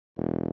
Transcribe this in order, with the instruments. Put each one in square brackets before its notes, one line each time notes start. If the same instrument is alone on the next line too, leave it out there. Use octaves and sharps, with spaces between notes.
[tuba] E1